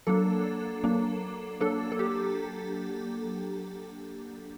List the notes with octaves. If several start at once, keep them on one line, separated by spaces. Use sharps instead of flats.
F#3 A#3 D4 A4
F#3 A#3 D4
F#3 A#3 D4 A4
A4
G4